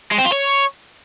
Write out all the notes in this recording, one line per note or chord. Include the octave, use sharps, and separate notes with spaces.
G#3
C4
F4
C#5